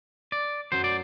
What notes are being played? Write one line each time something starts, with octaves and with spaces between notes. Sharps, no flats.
D5
F#2 F#3 C5
D5